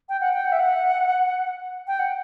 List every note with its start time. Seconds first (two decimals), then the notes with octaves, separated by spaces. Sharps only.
0.09 G5
0.21 F#5
0.33 G5
0.45 F#5
0.52 E5
0.59 F#5
1.87 G5
1.99 F#5